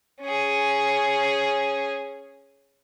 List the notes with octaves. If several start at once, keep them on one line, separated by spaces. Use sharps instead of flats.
C#4 G#4